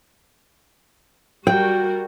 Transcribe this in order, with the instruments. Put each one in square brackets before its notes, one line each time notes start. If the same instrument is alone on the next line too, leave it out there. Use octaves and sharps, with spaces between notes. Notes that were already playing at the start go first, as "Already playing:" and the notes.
[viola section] G3 F#4 A#4 [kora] G5